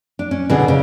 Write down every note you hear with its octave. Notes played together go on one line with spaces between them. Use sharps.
D4
C#4
B2 D3 G#4
C#3